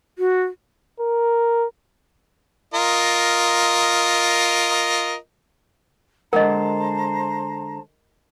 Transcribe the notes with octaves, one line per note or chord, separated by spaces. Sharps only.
F#4
A#4
F4 A#4 D#5
D3 G#3 A#4 C5 D#5 F#5 A5 A#5